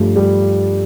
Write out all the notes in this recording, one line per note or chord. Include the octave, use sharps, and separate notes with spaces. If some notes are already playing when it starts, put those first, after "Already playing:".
Already playing: G2 F3 G3 A3
G3